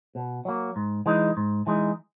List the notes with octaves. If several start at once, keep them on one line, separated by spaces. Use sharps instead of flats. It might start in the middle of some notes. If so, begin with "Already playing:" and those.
B2
F#3 A#3
G#2
E3 G#3 D#4
G#2
E3 G#3 D#4